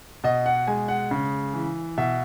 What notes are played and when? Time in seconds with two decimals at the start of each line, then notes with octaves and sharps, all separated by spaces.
0.24 B2 D#5
0.46 F#5
0.67 G#3 G#5
0.88 F#5
1.11 C#3
1.54 E3
1.97 B2 E5